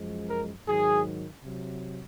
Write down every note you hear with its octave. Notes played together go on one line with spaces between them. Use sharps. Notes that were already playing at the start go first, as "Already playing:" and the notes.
Already playing: F#2 F3 G#3
A#4
G#2 D#3 F#3 G#4
C3 F#3